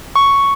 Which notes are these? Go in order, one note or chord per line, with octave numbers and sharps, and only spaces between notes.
C#6